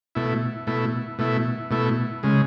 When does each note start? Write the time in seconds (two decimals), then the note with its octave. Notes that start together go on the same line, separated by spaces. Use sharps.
0.15 B2 A3 E4
0.67 B2 A3 E4
1.19 B2 A3 E4
1.71 B2 A3 E4
2.23 C#3 G#3